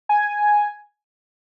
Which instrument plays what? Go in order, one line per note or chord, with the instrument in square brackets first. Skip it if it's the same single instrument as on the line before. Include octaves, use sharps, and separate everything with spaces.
[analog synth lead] G#5